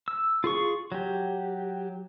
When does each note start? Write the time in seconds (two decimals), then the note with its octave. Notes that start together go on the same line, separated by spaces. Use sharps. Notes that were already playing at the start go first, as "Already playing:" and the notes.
0.08 E6
0.44 F4 G#4 C#6
0.92 F#3 G4